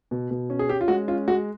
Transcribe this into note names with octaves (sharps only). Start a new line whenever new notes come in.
B2
B2
C#4
G#4
C#4 G4
F4
G#3 F#4
C#4 F4
G#3 F#4